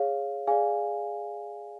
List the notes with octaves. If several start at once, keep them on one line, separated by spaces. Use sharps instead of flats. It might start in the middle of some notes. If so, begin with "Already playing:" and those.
Already playing: G#4 C#5 F5
G#4 D5 F5 G#5